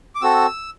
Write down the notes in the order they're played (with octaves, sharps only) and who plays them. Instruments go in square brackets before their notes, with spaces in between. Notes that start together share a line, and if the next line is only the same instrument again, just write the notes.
[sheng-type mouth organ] D6
C4 F#4 A4 E6